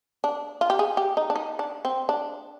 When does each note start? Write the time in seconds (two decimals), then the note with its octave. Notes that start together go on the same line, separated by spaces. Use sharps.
0.24 D4
0.61 F4
0.70 G4
0.79 G#4
0.97 G4
1.17 D#4
1.30 D4
1.36 D#4
1.59 D4
1.85 C4
2.09 D4